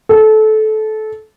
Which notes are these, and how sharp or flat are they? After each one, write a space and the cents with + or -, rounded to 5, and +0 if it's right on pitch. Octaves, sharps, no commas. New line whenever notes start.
A4 -20